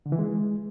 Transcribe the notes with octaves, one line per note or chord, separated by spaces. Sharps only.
D3
E3
G#3